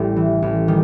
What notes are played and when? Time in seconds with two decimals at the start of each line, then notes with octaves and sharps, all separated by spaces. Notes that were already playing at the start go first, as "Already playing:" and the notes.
Already playing: A1 A2 G3
0.16 E3
0.42 A1
0.68 D#3 G3